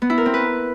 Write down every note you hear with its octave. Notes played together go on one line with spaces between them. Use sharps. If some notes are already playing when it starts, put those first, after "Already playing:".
B3
E4
A#4
C4
B4